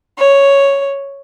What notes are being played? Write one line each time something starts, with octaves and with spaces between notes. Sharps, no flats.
C#5